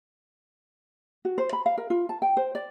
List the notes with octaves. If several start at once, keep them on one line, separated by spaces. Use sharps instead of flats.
F#4
C5
B5
F5
A#4
F4
A5
G5
C5
D5